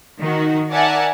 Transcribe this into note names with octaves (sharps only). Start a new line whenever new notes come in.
D#3 F#4
A#4 D5 E5 F#5 G#5 A5